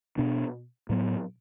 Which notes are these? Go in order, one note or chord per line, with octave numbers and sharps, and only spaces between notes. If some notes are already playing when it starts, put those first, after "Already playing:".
B2 B3 D4
A2 F#3 B3